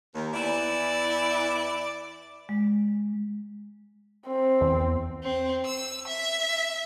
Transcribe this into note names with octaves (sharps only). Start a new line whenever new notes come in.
D#2
E2 E3 E4 D5
G#3
C4
E2
C4
E6
E5